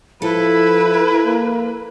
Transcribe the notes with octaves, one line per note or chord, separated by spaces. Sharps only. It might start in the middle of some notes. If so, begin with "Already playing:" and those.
F3 E4 A4 B4
A#3